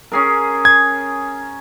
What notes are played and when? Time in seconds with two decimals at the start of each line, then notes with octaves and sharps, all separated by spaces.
0.12 C#4 G#4 A#4
0.65 G#6